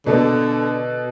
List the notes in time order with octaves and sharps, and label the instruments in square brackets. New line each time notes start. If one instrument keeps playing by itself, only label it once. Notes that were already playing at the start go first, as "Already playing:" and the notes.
[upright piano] B2 A4 [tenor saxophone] D3